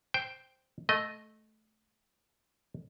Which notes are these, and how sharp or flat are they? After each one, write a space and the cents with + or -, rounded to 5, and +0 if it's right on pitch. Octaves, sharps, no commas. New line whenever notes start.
C5 +0 G5 +0
A3 -15 D#5 +0